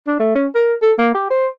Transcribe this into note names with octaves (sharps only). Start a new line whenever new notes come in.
D4
A3
C#4
A#4
A4
A#3
G4
C5